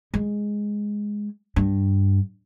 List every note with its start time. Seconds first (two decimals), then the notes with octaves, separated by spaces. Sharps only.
0.14 G#3
1.56 G2